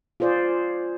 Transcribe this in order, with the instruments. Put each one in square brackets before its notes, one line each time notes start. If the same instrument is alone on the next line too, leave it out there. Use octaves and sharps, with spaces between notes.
[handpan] F4 G#4 C5 D5